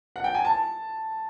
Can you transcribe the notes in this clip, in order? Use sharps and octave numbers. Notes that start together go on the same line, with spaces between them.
F#5
G5
G#5
A5